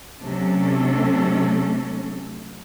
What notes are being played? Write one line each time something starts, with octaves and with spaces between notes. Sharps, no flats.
C3 F#3 A3 C#4 D4 A4